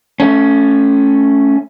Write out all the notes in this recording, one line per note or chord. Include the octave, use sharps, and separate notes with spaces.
A3 C#4